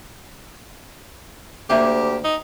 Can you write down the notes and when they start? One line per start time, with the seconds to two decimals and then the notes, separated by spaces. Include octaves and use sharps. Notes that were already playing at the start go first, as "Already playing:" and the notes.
1.70 D2 A#3 G4 C5 E5
2.24 D#4